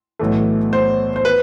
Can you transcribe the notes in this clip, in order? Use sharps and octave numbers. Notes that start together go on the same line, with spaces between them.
B1 A2 E3 A3
C5
C5
B4